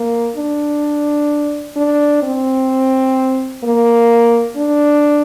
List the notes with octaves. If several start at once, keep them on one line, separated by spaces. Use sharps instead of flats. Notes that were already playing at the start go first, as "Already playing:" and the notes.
Already playing: A#3
D4
D4
C4
A#3
D4